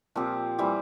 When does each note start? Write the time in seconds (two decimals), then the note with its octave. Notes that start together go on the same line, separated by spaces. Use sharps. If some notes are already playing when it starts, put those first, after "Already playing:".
0.15 A#2 F3 C4 G4
0.58 E3 G3 C4 G4